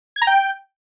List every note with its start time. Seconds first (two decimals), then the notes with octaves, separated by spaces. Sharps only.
0.16 G#6
0.22 A#5
0.27 G5